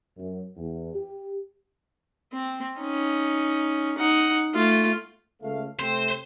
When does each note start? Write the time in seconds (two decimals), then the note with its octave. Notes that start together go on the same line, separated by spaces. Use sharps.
0.17 F#2
0.57 E2
0.93 G4
2.33 C4
2.80 C#4 D#4
3.97 D#4 F#5
4.55 A3 F4
5.42 C#2 A3 F5
5.79 C3 A3 C4 C5